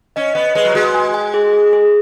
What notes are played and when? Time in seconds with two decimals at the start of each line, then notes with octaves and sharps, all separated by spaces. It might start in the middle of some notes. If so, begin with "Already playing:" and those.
0.16 C#4 D#5
0.35 B3 D#5
0.55 G#3 B4
0.65 F#3
0.75 G#3 F#4
0.94 G#5
1.14 G#5
1.34 G#4
1.53 G#4
1.73 G#4